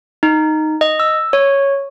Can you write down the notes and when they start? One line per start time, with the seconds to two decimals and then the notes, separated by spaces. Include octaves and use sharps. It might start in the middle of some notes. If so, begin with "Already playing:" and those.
0.23 D#4
0.81 D#5
1.00 E6
1.33 C#5